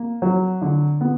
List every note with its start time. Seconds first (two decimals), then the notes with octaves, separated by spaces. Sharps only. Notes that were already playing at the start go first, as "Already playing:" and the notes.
Already playing: A#3
0.22 F#3
0.62 D3
1.01 B3